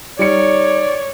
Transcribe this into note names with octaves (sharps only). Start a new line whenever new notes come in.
G3 D#4 C#5 D5 C#7